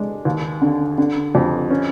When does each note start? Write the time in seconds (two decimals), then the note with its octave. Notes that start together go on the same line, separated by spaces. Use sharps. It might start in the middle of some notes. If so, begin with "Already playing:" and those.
Already playing: G#3 D4
0.25 D#2
0.62 D3
0.98 D3
1.35 F2
1.70 C#4